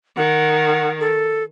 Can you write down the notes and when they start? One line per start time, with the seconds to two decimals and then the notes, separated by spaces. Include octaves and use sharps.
0.17 D#3 F#5
1.00 A4